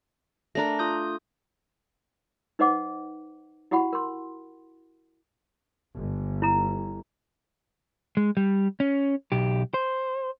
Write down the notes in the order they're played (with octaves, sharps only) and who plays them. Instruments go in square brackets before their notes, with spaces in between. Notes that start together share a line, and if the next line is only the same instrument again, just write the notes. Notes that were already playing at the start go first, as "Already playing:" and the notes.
[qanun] A3 D4 A#4 [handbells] A#5 A#6
[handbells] F4 D#6 G6
[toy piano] D#4 B4 C5 D#5 F#5 D6
E4 F#4 G4 F#5 B5
A#4 C6
[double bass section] G1
[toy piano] E4 A#5
[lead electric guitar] G#3
G3
C#4
B1 G4
C5